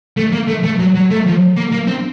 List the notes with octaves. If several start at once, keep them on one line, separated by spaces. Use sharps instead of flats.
A3
A#3
A3
A3
F#3
F#3
A3
F3
A#3
A#3
C4